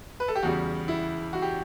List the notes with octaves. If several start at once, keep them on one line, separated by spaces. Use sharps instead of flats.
B4
A4
G4
E2 C#3 G3 F#4
E4
F#4
G4